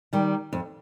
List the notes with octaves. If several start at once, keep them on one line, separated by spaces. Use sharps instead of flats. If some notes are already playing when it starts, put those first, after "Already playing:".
D#3 G3
F2